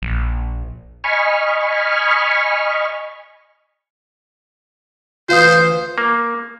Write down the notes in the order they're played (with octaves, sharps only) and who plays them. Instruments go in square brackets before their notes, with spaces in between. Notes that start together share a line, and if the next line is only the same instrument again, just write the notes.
[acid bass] A#1
[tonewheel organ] D#5 G#5 B5 C#6 F6
[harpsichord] D2 E3 [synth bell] F4 F5 D#6 [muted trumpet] C5
[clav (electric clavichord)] A#3